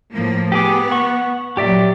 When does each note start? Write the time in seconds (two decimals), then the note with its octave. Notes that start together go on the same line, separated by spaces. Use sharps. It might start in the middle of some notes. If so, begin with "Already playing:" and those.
0.12 A2 F3 A#3
0.52 B3 G4 G#4 D6
0.91 F#5 C#6
1.57 A#2 F#3 G4 D5 E5